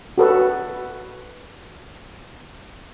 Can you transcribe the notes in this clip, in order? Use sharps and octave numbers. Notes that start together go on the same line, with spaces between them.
F#4 A4 B4